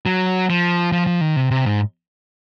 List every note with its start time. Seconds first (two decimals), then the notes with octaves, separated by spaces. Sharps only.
0.06 F#3
0.49 F3
0.92 F3
1.07 F3
1.21 D#3
1.36 C3
1.51 C3
1.65 G#2